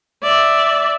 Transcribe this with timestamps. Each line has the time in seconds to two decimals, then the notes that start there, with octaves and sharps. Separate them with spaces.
0.23 D5 E5